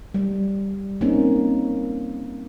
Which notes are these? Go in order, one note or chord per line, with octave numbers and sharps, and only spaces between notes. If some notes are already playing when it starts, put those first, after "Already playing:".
G3
A#3 C4 C#4 D#4